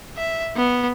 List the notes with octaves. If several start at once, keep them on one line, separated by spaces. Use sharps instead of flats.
E5
B3